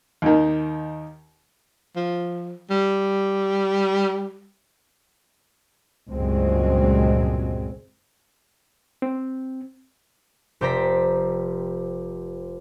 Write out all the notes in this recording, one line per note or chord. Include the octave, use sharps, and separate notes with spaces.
D#2 D#3
F3
G3
C#2 G2 A#2 F#3 G#3 C4
C4
F1 G4 C5 D5 A#5 B6